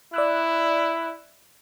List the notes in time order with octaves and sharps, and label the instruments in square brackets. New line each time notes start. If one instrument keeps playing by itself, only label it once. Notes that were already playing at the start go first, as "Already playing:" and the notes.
[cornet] E4 [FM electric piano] D5 E6 F#6